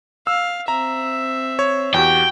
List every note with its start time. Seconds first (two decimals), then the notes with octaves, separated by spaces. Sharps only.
0.27 F5 E6
0.68 C4 E5 A#5
1.59 C#5
1.94 E2 F#4 G4 G5